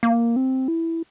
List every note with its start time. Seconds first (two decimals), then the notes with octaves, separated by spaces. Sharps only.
0.03 A#3
0.36 C4
0.68 E4